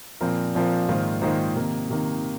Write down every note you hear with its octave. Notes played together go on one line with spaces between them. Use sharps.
A#2 F3 C4 F4 A#4
A#2 F3 C4 F4 A#4
G#2 D#3 A#3 F4 C5
G#2 D#3 A#3 F4 C5
C3 D#3 A#3
C3 D#3 A#3